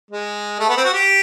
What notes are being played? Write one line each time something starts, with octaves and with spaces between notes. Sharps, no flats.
G#3
A3
B3
C4
F#4
G4